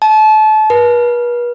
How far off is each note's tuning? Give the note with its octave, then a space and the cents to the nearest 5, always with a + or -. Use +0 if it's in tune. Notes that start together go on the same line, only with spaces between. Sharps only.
A5 -30
B4 -40